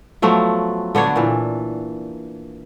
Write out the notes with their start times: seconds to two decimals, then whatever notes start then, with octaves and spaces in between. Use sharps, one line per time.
0.22 F3 F#3 A3 B3
0.95 D3 B3 D4 C#5
1.16 A#2 E3